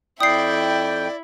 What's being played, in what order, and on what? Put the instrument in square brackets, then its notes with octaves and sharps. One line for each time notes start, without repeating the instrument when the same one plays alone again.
[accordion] F2 G5 [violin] E4 [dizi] D5 [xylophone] D#6 C7